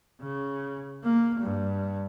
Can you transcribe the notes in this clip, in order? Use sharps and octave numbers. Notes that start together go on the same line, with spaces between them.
C#3
A#3
G2